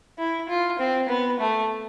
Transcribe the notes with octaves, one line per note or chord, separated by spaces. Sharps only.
E4
F4
C4
B3
A3